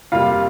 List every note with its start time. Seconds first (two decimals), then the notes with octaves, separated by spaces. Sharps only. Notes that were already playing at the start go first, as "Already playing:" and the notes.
0.12 F2 C3 G3 A#3 F4 F5